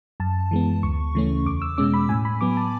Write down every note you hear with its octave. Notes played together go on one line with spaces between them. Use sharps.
F#2 A5
E3 G#3 B3
D2 C#6
C#3 E3 A3 C#4
E2 D6
E6
B2 G#3 C#4 D6
B5
A2 G#5
B5
F#3 B3 D6
A5